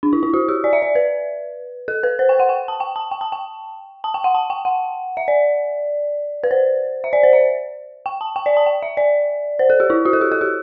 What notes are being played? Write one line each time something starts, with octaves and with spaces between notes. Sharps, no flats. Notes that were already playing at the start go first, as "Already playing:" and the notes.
D4
E4
E4
F#4
G4
D5
E5
D5
B4
A4
B4
C5
G5
F#5
G5
A5
G5
A5
G5
A5
G5
A5
G5
F#5
A5
G5
F#5
E5
D5
B4
C5
E5
D5
C5
E5
G5
A5
G5
D5
A5
G5
E5
D5
C5
A4
G4
E4
F#4
A4
G4
A4
G4